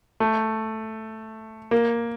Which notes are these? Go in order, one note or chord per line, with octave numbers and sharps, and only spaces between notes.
A3
A#3